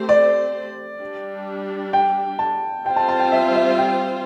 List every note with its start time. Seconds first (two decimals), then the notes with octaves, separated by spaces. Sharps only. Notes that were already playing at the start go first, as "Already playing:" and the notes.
Already playing: A3 C4 G4 C5
0.09 D5
1.00 G3 D4 G4
1.93 G5
2.39 A5
2.85 G3 C4 F4 C5 G5
2.96 A5
3.09 A5
3.20 G5
3.32 E5
3.55 E5
3.78 G5